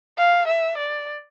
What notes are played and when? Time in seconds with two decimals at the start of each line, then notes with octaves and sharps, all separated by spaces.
0.18 F5
0.48 E5
0.78 D5